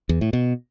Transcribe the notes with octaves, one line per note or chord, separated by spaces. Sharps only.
E2
A2
B2